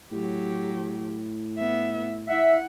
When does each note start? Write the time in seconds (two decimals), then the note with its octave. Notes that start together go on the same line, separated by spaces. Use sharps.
0.11 A2 F#3 G4
1.58 B3 E5
2.28 E4 E5 F#5